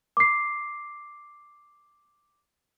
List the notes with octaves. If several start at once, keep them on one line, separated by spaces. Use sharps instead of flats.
D6 C7